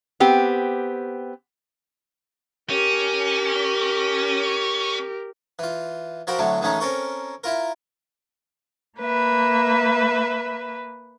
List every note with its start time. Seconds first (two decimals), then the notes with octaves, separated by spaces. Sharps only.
0.20 B3 C4 G4
2.70 C#4 G4 A#4
5.59 E3 F4
6.27 F3 F#4 A#4 C5 G5 B5
6.39 A2 D3 F#3 A3 C4
6.61 A1 D#3 G#3 A3 C#4 D#4
6.80 C4 C#4 A4 A#4 C#5
7.44 E4 F4 A#4
8.98 A#3 B4 E5